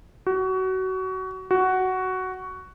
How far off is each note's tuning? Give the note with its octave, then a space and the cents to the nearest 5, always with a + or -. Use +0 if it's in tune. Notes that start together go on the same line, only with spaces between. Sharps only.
F#4 +25
F#4 +10